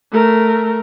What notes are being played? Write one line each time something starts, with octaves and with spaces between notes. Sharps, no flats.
A3 A#4